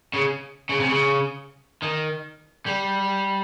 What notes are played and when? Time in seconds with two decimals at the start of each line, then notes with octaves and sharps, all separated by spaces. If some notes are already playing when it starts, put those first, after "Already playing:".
0.13 C#3
0.69 C#3
0.80 C3
0.89 C#3
1.82 D#3
2.66 G3